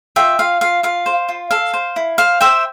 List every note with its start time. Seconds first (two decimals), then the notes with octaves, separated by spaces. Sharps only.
0.16 F4 E5 G5
0.39 F4 F5
0.61 F4 F5
0.83 F4 F5
1.06 C5
1.29 F4
1.51 A4 F5
1.74 C5
1.96 E4
2.18 C5 F5
2.41 C5 E5 G5